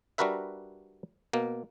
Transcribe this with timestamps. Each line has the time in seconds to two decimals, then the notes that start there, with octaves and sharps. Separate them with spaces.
0.18 G3 D4 F#4 A#4 B4 E5
1.33 B2 A#3